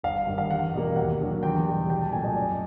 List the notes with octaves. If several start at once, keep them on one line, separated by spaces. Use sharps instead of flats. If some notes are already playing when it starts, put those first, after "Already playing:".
G1 F5
G2 D#3
F5
E2 F#5
B2 G3 A#3
D#2 F#5
D3 F#3 A#3
E2 G5
B2 G3
C2 G5
A5
A#2 F#3 A3 G#5
D#5
F#2 D5